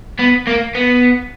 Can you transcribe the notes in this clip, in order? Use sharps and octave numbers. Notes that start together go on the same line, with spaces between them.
B3
A#3
B3